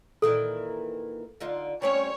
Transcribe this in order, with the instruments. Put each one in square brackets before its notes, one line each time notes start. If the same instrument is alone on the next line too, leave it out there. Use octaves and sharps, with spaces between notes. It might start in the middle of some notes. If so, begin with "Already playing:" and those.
[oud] A#2 D#3 E3 [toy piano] A4
[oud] D3 D#4 F4
[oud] G3 C4 C#4 [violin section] C#5